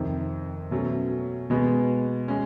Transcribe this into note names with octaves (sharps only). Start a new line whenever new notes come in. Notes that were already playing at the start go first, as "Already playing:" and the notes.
Already playing: F2 C3 D#3
B2 F#3 A3 C#4
B2 G#3 B3
G#3 C#4